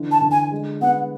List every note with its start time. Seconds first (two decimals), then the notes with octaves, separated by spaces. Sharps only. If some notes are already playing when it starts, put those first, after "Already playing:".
Already playing: D3 E3
0.11 A5
0.21 D3
0.31 G#5
0.52 G#3
0.81 B3 F#5